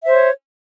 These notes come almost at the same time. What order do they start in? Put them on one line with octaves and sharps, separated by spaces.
E5 C5 C#5